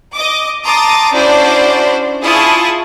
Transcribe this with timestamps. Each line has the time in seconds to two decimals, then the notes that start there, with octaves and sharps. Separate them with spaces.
0.15 D#5 D6
0.65 A5 A#5 C6 D6 D#6 A6
1.13 C#4 D4 E4 F#4 C5 D5
2.23 E4 F4 G#4 A5 C#6 D#6